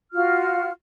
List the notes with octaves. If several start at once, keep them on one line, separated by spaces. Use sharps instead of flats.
F4 F#4 F6